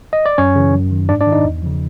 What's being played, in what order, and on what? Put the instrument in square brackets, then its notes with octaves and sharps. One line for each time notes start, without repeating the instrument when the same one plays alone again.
[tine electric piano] D#5
D5
F#2 C#4 C#5
C#3 E3
F#2
D#3
G#2 D4 D5
D4 D5
D#3
D#4 D#5
E2
C#3 F3